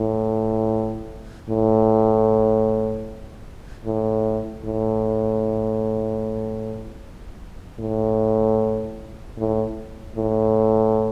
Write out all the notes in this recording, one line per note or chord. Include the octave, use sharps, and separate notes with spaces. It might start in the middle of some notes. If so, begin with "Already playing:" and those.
Already playing: A2
A2
A2
A2
A2
A2
A2